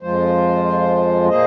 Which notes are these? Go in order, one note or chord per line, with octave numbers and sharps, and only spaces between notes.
F2 F3 G#3 F4 C5
A#2 A#3 G#4 C5 D#5